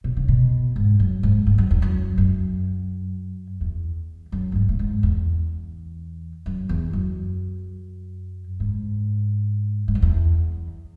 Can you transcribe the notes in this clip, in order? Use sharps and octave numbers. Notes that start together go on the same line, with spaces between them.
B2
C#3
B2
G#2
F#2
G#2
G#2
F#2
E2
F#2
F#2
E2
F#2
A2
G#2
A2
G#2
E2
F#2
E2
F#2
G#2
G#2
F#2
E2